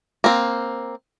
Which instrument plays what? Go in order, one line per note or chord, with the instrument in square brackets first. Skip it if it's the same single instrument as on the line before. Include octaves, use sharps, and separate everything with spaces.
[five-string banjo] A#3 C4